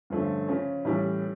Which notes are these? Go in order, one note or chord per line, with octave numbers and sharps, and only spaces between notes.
G2 D3 F3 A3 C#4
C#3 F3 C#4
A2 E3 G3 C#4